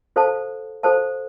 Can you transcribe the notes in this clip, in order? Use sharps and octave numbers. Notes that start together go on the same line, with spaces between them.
F#4 A4 C5 F5 A5
F#4 A4 C5 F5 A5